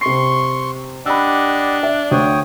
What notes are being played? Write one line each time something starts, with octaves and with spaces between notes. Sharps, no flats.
C3 C6 C#6 C7
D4 G4 D#5 F#5 B5 E6
E5
D2 C#5 G5 D#6